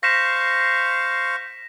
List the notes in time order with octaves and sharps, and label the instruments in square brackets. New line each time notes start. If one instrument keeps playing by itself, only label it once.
[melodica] C5 F5 C#6 [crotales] A#6 B6 E7